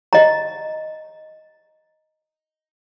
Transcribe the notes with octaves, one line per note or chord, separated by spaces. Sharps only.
D#5 A#5